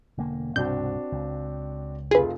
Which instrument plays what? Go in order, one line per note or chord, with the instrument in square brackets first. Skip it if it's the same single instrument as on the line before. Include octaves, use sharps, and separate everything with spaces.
[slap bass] E1 D3 A#3
[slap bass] C2 G2 B2 [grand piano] C4 D4 F#4 [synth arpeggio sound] G6
[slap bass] C#2
[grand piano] F1 F4 [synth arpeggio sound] G#4 B4